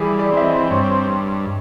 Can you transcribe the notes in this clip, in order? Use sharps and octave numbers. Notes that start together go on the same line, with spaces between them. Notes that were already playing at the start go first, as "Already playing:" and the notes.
Already playing: E3 G3 G#4
D5
C4 E5
D#5
G2 C#5